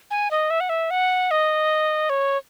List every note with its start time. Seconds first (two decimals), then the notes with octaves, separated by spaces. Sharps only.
0.11 G#5
0.31 D#5
0.50 E5
0.60 F#5
0.69 E5
0.91 F#5
1.31 D#5
2.10 C#5